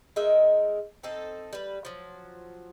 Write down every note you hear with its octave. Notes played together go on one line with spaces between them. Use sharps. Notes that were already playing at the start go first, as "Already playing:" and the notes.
G#3 D#4 A#4 E5
C4 D#4 A4
G3 B4
F3 F#3